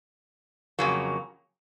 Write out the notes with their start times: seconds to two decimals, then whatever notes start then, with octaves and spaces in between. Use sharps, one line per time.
0.79 F2 C#3 F#3 A#3